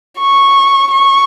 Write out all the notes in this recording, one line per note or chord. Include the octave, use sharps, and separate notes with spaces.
C#6
C#6